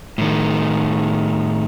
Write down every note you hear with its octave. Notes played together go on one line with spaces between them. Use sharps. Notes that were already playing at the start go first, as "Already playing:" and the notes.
A2 D#3